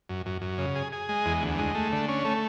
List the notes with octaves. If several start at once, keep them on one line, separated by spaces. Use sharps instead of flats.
F#2
F#2
F#2
C#3
G#4
G#4
G#3
E2
D2
G#3
A3
D3
C#4
A3